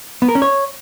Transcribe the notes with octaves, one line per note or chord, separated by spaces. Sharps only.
B3
A#4
C#4
C#5